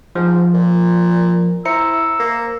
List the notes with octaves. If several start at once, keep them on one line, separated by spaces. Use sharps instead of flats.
G#2 F3
A#2
E4 C5 A#5 E6 C#7
A#3